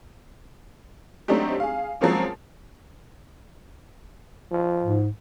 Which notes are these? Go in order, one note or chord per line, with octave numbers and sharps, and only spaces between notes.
F#3 A3 C4 D4 D#4 G4
G#4 F5
F3 F#3 G#3 A#3 C4 C#4
F3
G#2